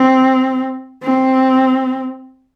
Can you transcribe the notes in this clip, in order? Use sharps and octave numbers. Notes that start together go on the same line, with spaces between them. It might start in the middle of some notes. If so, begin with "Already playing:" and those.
Already playing: C4
C4